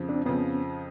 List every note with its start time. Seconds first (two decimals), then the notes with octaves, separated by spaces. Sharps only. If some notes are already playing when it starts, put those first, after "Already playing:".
Already playing: F2 C#3 F3
0.09 C4 D4
0.26 F2 C#3 F3 B3 C#4